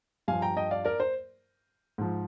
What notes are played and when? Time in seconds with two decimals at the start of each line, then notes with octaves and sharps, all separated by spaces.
0.28 G2 F3 F5 G#5
0.42 G5 A#5
0.57 D#5 G5
0.71 D5 F5
0.85 A#4 D5
1.00 C5
1.98 G#2 F3